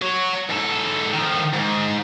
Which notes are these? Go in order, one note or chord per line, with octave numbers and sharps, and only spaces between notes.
F#4 C#5
G#2 A4
D#3 F3
G#2